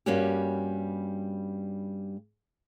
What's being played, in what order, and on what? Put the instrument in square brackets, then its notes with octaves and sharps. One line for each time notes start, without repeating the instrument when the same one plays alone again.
[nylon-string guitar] G2 G3 A#3 C#4 F#4 G4